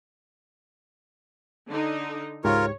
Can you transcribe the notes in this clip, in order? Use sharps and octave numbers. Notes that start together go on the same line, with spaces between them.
D3 D#4
C#2 G#2 F4 G4 A#4 C#5